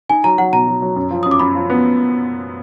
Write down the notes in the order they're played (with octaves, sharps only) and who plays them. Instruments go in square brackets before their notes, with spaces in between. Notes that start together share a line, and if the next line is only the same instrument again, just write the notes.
[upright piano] D#4 [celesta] G#5
[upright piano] F#3 [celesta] A#5
[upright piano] F#3 [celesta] F#5
[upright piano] B2 [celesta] A#5
[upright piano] F#3
F#3
F#2
F3
[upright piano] F#2 [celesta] D#6
[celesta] D6
[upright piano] F#2 [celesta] B5
[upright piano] F3
B3